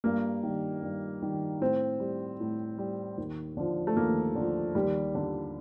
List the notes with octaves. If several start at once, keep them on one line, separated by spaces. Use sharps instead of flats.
G2 A#3
D#3 G3
G2
D#3 G3
A2 C4
G3
A2
G3
D#2
D3 F3
A3
D#2 A#3
D3 F3
D#2 G3
D3 G3